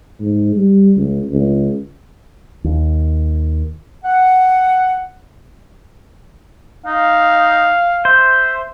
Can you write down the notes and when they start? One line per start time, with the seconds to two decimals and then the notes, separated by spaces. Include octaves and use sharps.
0.20 G#2
0.56 G3
0.97 C#2
1.31 C#2
2.64 D#2
4.04 F#5
6.86 D#4 F5
8.05 C5 E5